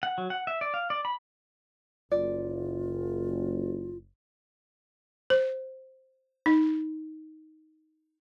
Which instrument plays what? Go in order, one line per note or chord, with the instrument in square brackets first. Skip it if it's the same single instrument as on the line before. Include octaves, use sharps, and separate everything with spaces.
[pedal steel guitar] F#5
F#3
F#5
E5
D5
F5
D5
B5
[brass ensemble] F#1 [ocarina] F4 [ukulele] D5
[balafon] C5
D#4